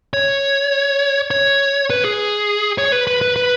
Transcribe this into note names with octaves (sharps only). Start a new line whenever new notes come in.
C#5
C#5
B4
G#4
C#5
B4
B4
B4
B4